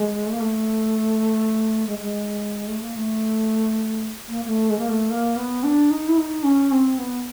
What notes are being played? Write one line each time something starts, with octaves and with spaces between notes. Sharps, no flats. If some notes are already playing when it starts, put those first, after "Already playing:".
Already playing: G#3
A3
A#3
A3
G#3
G#3
A3
A#3
A3
A#3
A#3
A3
G#3
A#3
A3
A#3
B3
D4
D#4
E4
D#4
C#4
C4
B3